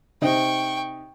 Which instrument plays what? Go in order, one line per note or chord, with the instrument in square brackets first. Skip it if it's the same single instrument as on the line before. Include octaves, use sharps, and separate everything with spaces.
[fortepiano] C3 D#4 C5 [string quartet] G5 C#6